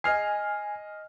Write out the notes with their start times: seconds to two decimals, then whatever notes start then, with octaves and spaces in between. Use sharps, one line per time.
0.04 D#5 G#5 F6 C7